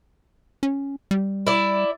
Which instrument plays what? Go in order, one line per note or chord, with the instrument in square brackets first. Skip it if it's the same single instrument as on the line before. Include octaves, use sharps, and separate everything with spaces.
[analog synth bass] C#4
G3
[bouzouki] E4 D5